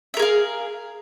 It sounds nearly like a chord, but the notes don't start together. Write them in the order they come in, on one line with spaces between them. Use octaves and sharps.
E5 A#4 G#4 F5